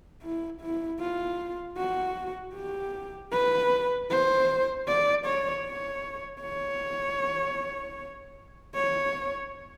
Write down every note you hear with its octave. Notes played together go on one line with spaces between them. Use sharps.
E4
E4
F4
F#4
G4
B4
C5
D5
C#5
C#5
C#5
C#5